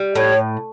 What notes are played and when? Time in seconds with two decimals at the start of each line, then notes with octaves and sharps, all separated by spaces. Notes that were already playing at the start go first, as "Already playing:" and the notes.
Already playing: G3
0.16 A2 C#5